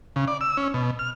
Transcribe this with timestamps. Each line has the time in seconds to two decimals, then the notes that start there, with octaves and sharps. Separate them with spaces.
0.16 C#3
0.28 D5
0.41 E6
0.57 C#4
0.74 B2
0.99 F6